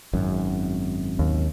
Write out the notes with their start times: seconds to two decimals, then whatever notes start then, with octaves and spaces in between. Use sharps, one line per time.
0.13 G#1 F#2
1.19 D#2